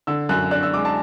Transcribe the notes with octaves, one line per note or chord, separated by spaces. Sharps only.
D3 E6
F#2 F#6
D4 F#6
E6
G#3 D6
A5